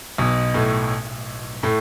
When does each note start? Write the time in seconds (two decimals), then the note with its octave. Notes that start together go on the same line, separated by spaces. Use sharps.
0.18 B1 B2
0.54 A2 A3
1.63 A2 A3